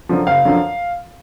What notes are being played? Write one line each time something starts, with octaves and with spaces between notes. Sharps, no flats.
F#2 D3 F3
F#1 F5
F#2 D3 F3